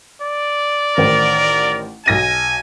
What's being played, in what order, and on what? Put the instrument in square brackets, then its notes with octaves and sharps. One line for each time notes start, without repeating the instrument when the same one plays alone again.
[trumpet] D5
[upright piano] A1 D#3 C5 [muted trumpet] A#4
[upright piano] B1 A#6 D#7 [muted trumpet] G#5